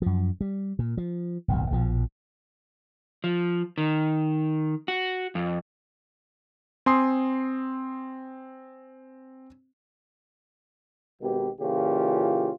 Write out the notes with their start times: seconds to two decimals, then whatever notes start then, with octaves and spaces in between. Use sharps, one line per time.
0.02 F#2 F3
0.41 G3
0.79 A#2
0.97 F3
1.48 D1 B1 F2
1.71 A#1 B2 F3
3.24 F3
3.78 D#3
4.88 F#4
5.35 F2
6.86 C4 G#5 C6 D#6 C7
11.22 G#1 B2 G4
11.61 A#2 C#3 E3 C#4 F4 G4